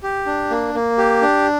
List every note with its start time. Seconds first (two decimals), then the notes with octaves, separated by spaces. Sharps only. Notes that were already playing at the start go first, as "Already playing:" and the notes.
0.03 G4
0.26 D4
0.50 A#3
0.74 A#3
0.98 G4
1.22 D4